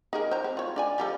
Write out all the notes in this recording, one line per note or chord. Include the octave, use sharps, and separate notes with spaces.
D#4 G#4 A#4
C5 A#5
C4
F4 C#5
D4 D5 G#5
F3 G3 A4